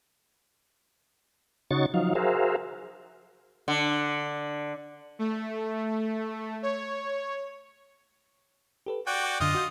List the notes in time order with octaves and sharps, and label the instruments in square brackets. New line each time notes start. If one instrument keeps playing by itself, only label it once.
[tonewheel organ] C#3 D#4 F#4 C#5 C#6 A6
F3 F#3 D#4 F5
F#4 G#4 A#4 C5 E5 F5
[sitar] D3
[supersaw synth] A3
C#5
[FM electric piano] G4 A4 B4
[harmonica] F#4 D5 G5 [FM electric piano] F#6
[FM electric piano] F#2 D3 F5 [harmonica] F4 D#5
[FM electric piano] F#4 G6